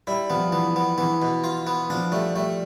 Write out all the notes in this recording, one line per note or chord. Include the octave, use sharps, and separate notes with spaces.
G3 E4
F3 B3
E3 B3
B3
E3 B3
B2
F4
B3
F3 D4
G3 A3
G3 A3